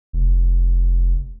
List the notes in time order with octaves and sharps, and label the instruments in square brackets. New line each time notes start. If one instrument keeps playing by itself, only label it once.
[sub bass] F1